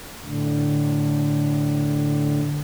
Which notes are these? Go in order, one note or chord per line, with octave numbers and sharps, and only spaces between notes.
A2 D3